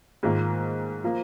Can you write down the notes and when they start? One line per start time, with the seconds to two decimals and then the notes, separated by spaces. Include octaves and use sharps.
0.23 G#2 D#3 A#3 F4
1.04 F3 A#3